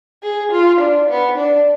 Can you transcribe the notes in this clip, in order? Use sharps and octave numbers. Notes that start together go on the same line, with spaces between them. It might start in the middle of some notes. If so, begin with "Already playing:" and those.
G#4
F4
D4
B3
D4